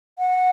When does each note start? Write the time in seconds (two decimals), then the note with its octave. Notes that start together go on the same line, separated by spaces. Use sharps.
0.19 F#5